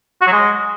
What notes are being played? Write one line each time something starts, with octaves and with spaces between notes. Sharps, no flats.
F#4
F#3
G#3